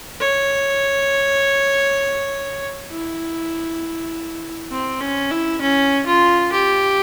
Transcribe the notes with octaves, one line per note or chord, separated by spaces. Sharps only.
C#5
E4
C4
C#4
E4
C#4
F4
G4